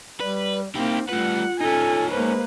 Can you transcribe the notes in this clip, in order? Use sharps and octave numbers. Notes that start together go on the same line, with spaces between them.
G3 B4 D5
A#3 C4 D#4 E4 G4
G3 A3 F4 B4 F#5
C#4 D#4 A4 G#5
G#3 A#3 B4 C5